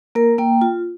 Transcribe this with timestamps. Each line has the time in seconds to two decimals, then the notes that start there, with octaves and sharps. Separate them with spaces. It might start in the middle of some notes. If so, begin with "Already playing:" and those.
0.15 A#3 A#4
0.38 A#3 G5
0.61 F4